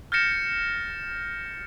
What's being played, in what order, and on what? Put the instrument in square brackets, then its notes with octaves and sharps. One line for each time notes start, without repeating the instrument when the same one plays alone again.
[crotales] F6 G6 A6 A#6 C#7 E7